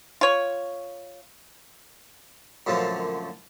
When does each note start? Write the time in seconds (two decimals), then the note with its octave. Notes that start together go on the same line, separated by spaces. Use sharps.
0.21 F4 C#5
2.66 F#2 A#2 D3 F3 A3